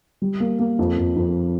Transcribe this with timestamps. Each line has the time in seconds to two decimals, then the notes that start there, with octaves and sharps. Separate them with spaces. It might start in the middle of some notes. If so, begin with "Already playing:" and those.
0.22 G3
0.40 A#3
0.59 A#3
0.79 F2
0.97 F2
1.16 F2